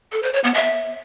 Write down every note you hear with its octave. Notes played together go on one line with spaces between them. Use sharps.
A4
C5
C#5
B3
E5